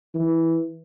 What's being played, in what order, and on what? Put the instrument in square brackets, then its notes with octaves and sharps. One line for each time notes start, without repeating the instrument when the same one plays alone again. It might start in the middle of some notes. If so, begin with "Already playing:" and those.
[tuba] E3